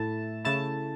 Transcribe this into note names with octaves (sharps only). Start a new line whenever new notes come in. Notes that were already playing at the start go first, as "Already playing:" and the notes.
Already playing: A2 A3 E4 A5
C#3 A3 E4 A5